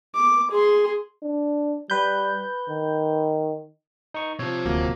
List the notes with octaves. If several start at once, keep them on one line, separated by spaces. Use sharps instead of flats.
D6
G#4 C6
D4
G3 B4 G6
D#3
D#4 C#6
C3 F3 C#5
D1 D2 F#3 A#3